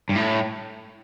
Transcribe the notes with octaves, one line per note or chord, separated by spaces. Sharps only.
G2
A2